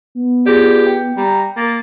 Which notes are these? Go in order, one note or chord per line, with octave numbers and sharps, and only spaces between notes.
B3
F4 G4 G#4 D5
G5
G3 A#5
A#3 A6